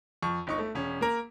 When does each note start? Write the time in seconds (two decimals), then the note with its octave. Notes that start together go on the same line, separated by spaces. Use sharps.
0.23 F2 C#6
0.47 G1 D#4 C#6
0.58 A3
0.75 E1 C#4
1.01 A#3 A#4